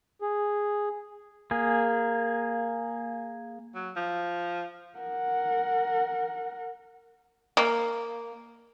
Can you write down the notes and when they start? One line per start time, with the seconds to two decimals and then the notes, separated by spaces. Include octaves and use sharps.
0.22 G#4
1.51 A#3 G#4
3.75 F#3
3.96 F3
4.99 A#4 F#5
7.57 A#3